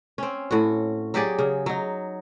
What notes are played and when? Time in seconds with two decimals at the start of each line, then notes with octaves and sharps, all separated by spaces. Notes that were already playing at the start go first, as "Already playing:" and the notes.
0.18 C4 C#4
0.51 A2 F#4
1.14 F#3 G4 G#4 D5
1.39 C#3
1.66 F#3 D#4